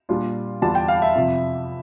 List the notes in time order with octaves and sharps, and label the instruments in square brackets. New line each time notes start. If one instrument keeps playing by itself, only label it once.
[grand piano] A#2 G3 D4 F4
E2 D3 G3 D4 F4 A5
G5
F5
E5
F2 C3 F3